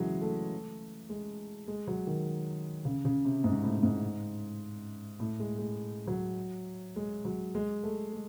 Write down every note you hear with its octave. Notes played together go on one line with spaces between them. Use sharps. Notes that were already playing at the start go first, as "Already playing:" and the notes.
Already playing: C#3 E3 F#3 G#3
A3
G#3
G#3
F#3
D#3
C#3
C#3
C3
G#2
A2
G#2
A2
G#3
G#3
F#3
G#3
F#3
G#3
A3
G#3